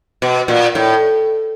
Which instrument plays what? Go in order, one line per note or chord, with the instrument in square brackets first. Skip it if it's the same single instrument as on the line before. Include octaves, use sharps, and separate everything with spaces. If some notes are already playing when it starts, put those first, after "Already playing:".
[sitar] B2
A#2
A2